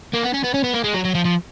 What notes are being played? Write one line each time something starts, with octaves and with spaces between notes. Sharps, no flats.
A#3
B3
C#4
B3
C#4
B3
A#3
G#3
F#3
F#3
F3
F3